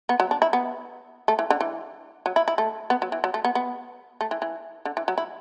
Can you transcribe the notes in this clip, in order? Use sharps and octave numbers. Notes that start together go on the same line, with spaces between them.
B3
F#3
D4
E4
B3
A3
E3
D3
E3
F#3
E4
E4
A3
B3
F#3
E3
F#3
A3
B3
B3
A3
E3
E3
D3
E3
F#3
E4